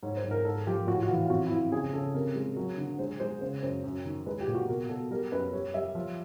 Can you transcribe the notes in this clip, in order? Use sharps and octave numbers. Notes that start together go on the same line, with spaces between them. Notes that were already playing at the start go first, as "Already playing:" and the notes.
G#2 C#5
C5
G#2
A#4
G#2 A4
F3 G4
A2 F#4
F#4
E3 F4
F4
F2 F#4
E4
F2 F4
C#3 G#4
C#3 A4
C3 A#4
G#3
F#3
D3
G#3 C5
G#3 C5
C#3 C5
F#2 C5
F#2
D#3
G#3 B4
G4
A#2
F#4
B2 A#4
B2 A4
G3 A#4
F#2 B4
G3 C#5
G3 E5
F3